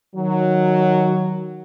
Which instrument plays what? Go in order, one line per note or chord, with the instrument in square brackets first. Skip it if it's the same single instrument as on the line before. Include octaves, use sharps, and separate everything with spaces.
[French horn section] D#3 F#3